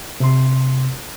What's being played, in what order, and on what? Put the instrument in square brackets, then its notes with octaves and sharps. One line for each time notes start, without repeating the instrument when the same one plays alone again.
[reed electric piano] C3 C6